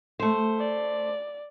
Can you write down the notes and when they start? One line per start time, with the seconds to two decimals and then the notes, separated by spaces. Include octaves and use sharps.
0.19 A3 C5
0.59 D5